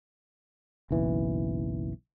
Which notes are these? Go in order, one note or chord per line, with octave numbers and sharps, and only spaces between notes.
F#1 B1 E3